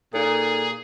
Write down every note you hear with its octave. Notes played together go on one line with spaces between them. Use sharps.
A#2 D#4 G#4 A4